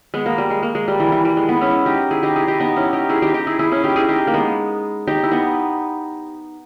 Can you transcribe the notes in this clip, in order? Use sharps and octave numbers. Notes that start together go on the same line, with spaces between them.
G#3 B3
A#3
G3
G#3
A#3
G#3
G3
E3
E3
G3
G#3
B3 D#4
C#4 E4
D#4 G4
E4 G#4
D#4 G4
E4 G#4
D#4 G4
B3 D#4
C#4 E4
D#4 G4
E4 G#4
D#4 G4
D#4 G4
E4 G#4
E4 G#4
C#4 E4
D#4 G4
E4 G#4
D#4 G4
A#3
G#3 B3
D#4 G4
E4
B3 D#4